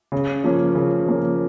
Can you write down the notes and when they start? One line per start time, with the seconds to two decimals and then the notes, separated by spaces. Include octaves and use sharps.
0.12 C#3
0.44 F3 A#3 C#4
0.75 C#3
1.06 F3 A#3 C#4